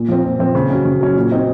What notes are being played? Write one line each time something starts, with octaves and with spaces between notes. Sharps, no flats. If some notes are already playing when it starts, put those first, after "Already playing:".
Already playing: A#2
F3 C4
A#2
F3 C4
C#3
F#3 C#4
C#3
F#3 C#4
A#2
F#3 C4 D#4